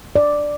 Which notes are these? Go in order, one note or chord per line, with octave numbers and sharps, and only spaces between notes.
D5